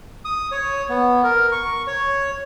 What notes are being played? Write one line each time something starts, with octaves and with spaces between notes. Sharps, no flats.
D#6
C#5
B3
A#4
C#6
C#5